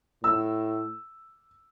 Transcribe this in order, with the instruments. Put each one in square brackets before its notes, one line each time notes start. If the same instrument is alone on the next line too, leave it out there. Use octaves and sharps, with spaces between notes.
[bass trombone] A2 [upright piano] E6